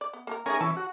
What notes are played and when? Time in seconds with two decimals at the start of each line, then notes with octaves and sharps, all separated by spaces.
0.01 D5
0.13 B3
0.27 A#3 A4 A#4
0.46 A3 C#4 D#4 G#4 A#4 G#5
0.61 E3 C#4 A5
0.77 F#4